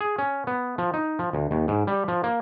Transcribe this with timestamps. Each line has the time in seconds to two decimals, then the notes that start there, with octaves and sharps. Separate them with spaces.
0.01 G#4
0.18 C#4
0.47 B3
0.78 F3
0.94 D#4
1.19 F3
1.33 D2
1.51 D#2
1.68 G#2
1.87 G3
2.08 F3
2.24 A#3